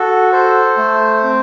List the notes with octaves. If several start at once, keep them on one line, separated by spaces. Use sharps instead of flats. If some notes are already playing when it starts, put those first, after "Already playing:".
Already playing: F#4 A4
A4 C5
A3
C4